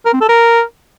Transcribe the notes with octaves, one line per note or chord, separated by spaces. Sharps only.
A#4
C4
A4
A#4